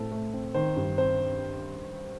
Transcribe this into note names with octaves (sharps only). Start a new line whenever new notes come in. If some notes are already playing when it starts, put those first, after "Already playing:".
Already playing: A2 C4 A4
A3
C4
D#3 C5
G2
C4 C5